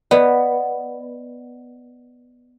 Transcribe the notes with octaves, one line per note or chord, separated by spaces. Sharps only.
B3 D5 D#5 F#5